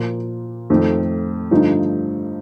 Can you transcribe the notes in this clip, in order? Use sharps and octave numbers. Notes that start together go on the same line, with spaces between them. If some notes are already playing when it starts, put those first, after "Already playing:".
Already playing: A#2 F3 A#3 F4
F2 D#3 A3
G2 D3 F3 A3 D#4